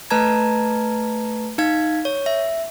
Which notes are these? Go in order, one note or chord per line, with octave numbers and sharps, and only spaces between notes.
A3 B4 A5 A#5 G#6
D#4 F5 G#6
C#5
E5